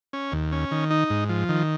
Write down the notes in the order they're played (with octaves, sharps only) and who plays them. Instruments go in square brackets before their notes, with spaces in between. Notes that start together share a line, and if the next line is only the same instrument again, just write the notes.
[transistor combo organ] C#4
D#2
C#4
D#3
D#4
G#2
F3
D#3